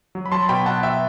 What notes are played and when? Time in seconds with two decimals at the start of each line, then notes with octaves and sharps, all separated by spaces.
0.15 F#3
0.26 B5
0.32 F#3 A5 C6
0.49 B2 G5 B5
0.66 B2 F#5 A5
0.83 B2 E5 G5